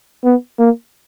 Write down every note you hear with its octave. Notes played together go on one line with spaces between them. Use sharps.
B3
A#3